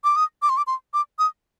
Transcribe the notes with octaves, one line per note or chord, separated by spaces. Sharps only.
D6
D#6
D6
C6
D6
C6
D6
D#6